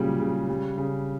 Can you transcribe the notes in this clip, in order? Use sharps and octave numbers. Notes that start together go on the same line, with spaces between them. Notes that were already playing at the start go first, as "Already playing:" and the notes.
Already playing: A#2 C#3 F#3 G3
C#3
G3
C#3